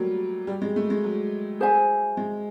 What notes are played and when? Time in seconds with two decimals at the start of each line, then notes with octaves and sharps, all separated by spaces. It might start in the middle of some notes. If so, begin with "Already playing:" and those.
Already playing: F#3 G3 A3 A#3
0.47 G3
0.62 G#3
0.76 A3
0.90 G#3
1.04 F#3
1.60 G#4 C5 E5 G#5
2.17 G#3